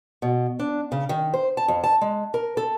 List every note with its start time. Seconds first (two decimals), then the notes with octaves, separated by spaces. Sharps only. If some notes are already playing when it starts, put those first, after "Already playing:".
0.22 B2
0.60 D4
0.92 C#3
1.09 D#3
1.34 C5
1.57 A5
1.68 F2
1.84 A5
2.01 G#3
2.34 A#4
2.57 A4